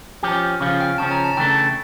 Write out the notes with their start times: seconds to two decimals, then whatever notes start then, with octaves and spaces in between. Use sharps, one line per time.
0.23 F3 C#4 G4
0.60 C#3 F3 C#4 F5
0.80 G5
0.98 C#3 F3 C#4 A5
1.11 A#5
1.24 A5
1.37 C#3 E3 A3 D4 A4 G5